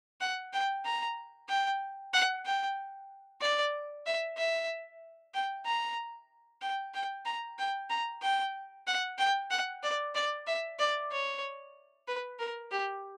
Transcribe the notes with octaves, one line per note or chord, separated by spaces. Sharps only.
F#5
G5
A#5
G5
F#5
G5
D5
E5
E5
G5
A#5
G5
G5
A#5
G5
A#5
G5
F#5
G5
F#5
D5
D5
E5
D5
C#5
B4
A#4
G4